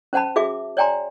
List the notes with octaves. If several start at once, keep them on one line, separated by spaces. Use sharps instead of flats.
C#4 C5 F#5 A5 B5
F#4 G#4 E5 D6
C#5 D5 G5 G#5 A#5 C6